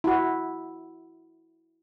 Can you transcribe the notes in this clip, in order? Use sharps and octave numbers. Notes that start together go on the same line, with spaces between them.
E4 F#4